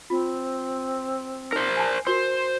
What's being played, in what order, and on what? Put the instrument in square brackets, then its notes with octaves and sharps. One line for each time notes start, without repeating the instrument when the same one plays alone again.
[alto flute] C4 [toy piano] F4
[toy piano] D#4 [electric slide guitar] A#4 C5
[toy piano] G#5 A5
[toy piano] F#4 A#4 C6 [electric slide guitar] C5